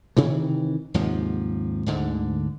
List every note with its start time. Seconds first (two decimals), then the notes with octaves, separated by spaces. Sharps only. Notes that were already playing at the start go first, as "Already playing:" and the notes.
0.17 C3 D#3 E3
0.94 D#2 G#2 C3 F3
1.86 D2 G#2 D3